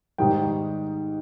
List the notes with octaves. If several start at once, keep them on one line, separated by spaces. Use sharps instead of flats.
G#2 D#3 G3 G5